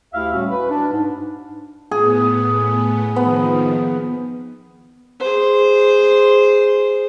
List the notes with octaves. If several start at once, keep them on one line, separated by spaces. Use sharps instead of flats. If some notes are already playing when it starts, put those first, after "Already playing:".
D2 E4 G4 E5 F5
A2 G3 A3 C#4 F#4
B4
D4
G#2
A2 B3 G#4
D#3 F3 B3
G#4 C5